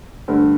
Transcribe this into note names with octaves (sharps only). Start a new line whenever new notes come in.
G2 D3 A3